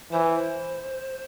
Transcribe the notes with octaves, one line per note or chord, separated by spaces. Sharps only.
E3 C5
B4
C5